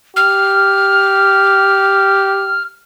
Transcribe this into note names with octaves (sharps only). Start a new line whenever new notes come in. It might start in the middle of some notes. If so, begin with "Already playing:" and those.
G4 F6